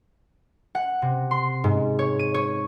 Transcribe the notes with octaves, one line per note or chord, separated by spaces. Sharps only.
F#5
C3
C6
G#2
C#5
D#7
C#5